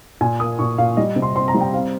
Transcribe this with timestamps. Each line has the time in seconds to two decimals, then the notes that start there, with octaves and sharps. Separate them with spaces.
0.21 A#2 G#5
0.40 A#3 D#6
0.59 A#2 C#6
0.78 A#2 F5
0.97 G3 D#5
1.16 C3
1.22 C6
1.36 C4 C6
1.48 A#5
1.54 G3
1.61 G5
1.74 C4 F5